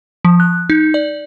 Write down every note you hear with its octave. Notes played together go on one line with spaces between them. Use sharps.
F3
F#6
D#4
D5